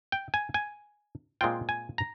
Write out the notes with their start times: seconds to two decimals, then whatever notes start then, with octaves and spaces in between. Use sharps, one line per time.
0.12 G5
0.34 G#5
0.54 G#5
1.41 A#2 G#3 C4 F4 G5
1.69 G#5
1.98 A#5